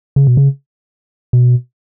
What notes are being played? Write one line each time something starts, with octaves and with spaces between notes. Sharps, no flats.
C#3
B2
C#3
B2